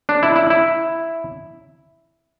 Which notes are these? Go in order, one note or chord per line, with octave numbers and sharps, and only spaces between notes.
D4
E4
E4
E4